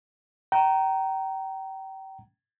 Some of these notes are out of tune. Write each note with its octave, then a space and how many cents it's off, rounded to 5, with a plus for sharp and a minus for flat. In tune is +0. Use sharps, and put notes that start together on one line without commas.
G5 -30 A#5 +0